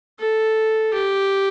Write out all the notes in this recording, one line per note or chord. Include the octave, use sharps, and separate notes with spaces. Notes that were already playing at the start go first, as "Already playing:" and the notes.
A4
G4